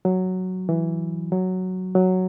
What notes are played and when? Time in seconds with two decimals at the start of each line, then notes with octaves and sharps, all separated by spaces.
0.05 F#3
0.69 E3
1.32 F#3
1.95 F#3